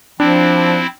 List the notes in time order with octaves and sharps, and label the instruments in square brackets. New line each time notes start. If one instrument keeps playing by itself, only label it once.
[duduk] F3 [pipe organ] C4 E4 [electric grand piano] D4